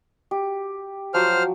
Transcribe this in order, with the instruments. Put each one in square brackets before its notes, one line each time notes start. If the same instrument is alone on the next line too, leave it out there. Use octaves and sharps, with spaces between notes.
[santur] G4
[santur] F3 F#3 [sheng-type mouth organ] C5 F6